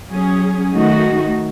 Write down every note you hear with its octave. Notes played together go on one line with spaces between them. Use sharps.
F#3 C#4 G#4
D#3 A3 D#4 F#4